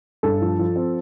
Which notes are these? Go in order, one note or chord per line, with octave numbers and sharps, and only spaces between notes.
G2 A4
F3
F3
C4